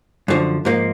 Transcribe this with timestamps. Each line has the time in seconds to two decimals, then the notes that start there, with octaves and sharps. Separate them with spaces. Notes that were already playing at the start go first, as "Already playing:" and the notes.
0.28 F#2 D3 F3
0.65 G#2 F3 A#3